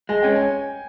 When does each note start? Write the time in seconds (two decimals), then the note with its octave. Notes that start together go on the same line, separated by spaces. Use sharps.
0.09 G#3 G#5
0.22 C#4 G5
0.36 G#5